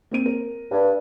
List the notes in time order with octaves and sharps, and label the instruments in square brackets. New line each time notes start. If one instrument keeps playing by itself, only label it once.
[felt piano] A#3 C4 D#7
A#4
[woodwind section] G2